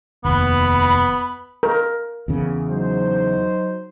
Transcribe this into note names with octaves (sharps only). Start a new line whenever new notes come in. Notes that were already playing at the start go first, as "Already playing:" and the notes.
F1 D#2 B3 B5
A#4
E2 C#3
F#3 D#4 C5